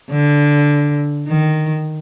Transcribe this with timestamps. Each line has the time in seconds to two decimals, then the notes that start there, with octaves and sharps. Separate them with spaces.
0.11 D3
1.28 D#3